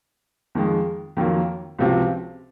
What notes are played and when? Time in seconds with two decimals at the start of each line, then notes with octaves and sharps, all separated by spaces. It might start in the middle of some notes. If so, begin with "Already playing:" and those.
0.55 F2 D#3 G#3
1.17 F2 D#3 F#3 A#3
1.79 C#2 C3 F3 C4 F#4